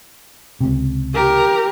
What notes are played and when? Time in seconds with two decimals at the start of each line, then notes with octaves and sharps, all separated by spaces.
0.61 C#2 C3
1.13 G4 A#4